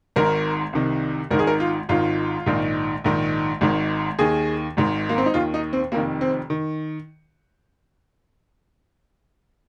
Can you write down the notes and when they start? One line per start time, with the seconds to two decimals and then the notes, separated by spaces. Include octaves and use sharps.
0.16 G#1 G#2 D#3 A#4
0.73 C2 C3 D#3
1.31 G#1 G#2 D#3 A#4
1.39 G#4
1.47 A#4
1.60 F4
1.89 G#1 G#2 D#3 F4
2.46 A#1 G#2 D#3
3.04 A#1 G#2 D#3
3.61 G#1 G#2 D#3
4.19 D#2 D#3 G#4
4.77 G#1 G#2 D#3
5.09 A#3
5.18 C4
5.26 D#4
5.34 D#2 D#3 F4
5.54 D#4
5.73 C4
5.92 F1 F2 D#3 A#3
6.21 C4
6.50 D#3